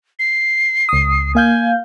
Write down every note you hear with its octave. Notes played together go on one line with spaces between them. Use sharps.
C7
C#2 D#6
A#3 F5 G#5 G6